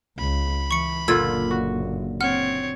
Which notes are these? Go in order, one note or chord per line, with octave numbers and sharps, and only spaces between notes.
C#2 B5
E3 C#6 C#7
F#1 A#2 D3 F4 E6 G#6 A6
F#4
C4 C#5 F#5 F6